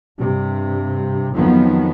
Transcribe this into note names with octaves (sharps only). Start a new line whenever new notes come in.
G2 C3
F2 D#3 F3 F#3 B3